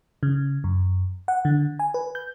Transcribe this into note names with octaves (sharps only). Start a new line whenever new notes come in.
C#3
F#2
F#5
D3
G#5
B4
G6